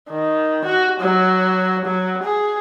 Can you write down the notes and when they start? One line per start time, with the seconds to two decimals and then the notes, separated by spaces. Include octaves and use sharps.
0.10 D#3
0.65 F#4
1.00 F#3
1.85 F#3
2.23 G#4